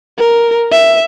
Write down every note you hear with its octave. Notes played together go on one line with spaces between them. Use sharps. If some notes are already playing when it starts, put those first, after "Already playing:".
A#4
E5